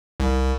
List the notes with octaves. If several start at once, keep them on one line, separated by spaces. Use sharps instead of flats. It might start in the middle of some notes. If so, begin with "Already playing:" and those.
C2